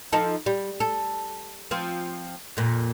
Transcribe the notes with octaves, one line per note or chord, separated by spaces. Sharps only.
F3 D#4 A4
G3
A4
F3 C4
F2 A#2